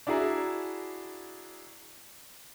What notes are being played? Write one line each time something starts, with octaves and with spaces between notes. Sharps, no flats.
D4 E4 F#4 G#4 A#5